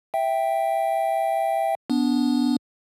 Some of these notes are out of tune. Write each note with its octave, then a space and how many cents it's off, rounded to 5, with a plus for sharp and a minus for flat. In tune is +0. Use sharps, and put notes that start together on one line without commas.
E5 +0 G5 +0
B3 +0 D4 -20